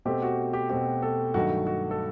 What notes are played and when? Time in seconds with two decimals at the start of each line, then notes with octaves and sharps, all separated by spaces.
0.05 B2 A3 C4 G4
0.22 F#4
0.53 G4
0.70 B2 A3 C4 G4
1.02 A4
1.34 G2 D#3 F#3 A3 F#4
1.67 F#4
1.91 A4